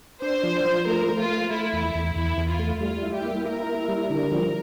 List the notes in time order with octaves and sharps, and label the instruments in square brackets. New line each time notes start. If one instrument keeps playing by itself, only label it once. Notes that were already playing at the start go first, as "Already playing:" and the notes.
[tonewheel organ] D4 [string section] C5
[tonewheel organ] F3
F3
[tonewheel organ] A3 [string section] A#4
[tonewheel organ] A3
[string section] F4
[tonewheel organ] A3
[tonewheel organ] A3 [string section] E4
[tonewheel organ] E2
E2
[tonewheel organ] E2 [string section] E4
[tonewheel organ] E2
[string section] F4
[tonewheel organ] A3
[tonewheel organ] G3 [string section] F4
[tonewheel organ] E4
[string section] G4
[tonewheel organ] A#3
[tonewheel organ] E4 [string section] A#4
[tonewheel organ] E4
G3
[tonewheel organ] D3 [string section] A#4
[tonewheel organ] F3